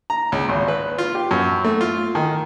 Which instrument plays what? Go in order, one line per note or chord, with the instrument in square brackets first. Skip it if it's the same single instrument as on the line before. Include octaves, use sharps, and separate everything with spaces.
[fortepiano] A#5
C#2
G#1
B4
F4
G4
F#2
A3
F4
D#3